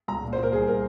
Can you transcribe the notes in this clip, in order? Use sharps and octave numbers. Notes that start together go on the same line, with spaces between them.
C#2 A#5
A#2
C5
A#2
A#4
C2 G#4
A#4